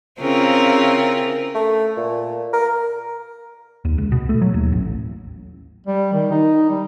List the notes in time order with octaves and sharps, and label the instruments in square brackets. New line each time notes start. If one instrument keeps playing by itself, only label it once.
[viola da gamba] C#3 E4 F4 [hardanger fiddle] C4 A#4
[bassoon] A3
A#2
A#4
[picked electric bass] D#2
C#2
B2
A3
F#3
D#2
A1
[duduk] G3
D#3
D#4
G3